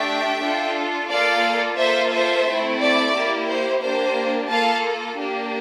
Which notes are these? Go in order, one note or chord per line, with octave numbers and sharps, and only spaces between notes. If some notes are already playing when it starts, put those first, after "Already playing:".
Already playing: A3 D4 G4 E5 G5
D4 F4 A4
A#3 F4 A4 D5 F5
A#3 F4 A4 C5 E5
C5 E5
A3 C4 E4
D5
A#3 E4 G4
C5
A#3 D4 G4 C5
A#3 F4 A4 F5 A5
A#3 D4 G4